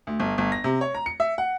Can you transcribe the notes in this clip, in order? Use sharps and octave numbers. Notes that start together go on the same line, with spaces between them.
D2
G1
G1
A#6
C3
C#5
A#5
C#7
E5
F#5